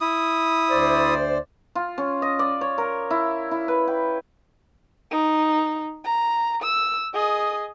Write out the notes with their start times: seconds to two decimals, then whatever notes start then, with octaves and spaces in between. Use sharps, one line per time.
0.01 E4 D#6
0.70 D2 C5 D5
1.75 F4
1.98 C#4
2.22 D#5
2.39 D5
2.61 C#5
2.78 A#4
3.10 E4
3.51 E4
3.68 B4
3.87 G5
5.11 D#4
6.05 A#5
6.63 E6
7.14 G#4 D#5